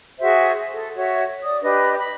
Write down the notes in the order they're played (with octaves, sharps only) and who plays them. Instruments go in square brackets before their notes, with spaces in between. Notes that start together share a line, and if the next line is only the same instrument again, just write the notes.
[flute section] F#4 G#4 C5 E5
A4
F#4 C#5 E5
D5 D#6
D4 G4 B4 D#5
B5